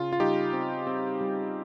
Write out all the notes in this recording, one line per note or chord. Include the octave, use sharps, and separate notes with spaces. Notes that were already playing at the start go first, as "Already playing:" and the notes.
Already playing: C#3 F4
F4
G3 D#4 G4
C4
C4
G3